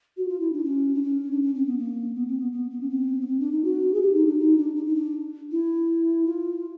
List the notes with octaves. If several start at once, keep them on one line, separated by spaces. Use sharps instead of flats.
F#4
F4
E4
D4
C#4
D4
C#4
D4
C#4
C4
B3
A#3
B3
C4
B3
B3
B3
C#4
C4
B3
C4
D4
D#4
F#4
G#4
G4
D#4
D4
D#4
D4
D4
D#4
D4
E4
F4